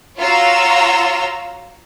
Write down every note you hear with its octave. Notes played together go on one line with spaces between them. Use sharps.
F4 F#4 C#5 F5 A#5 E6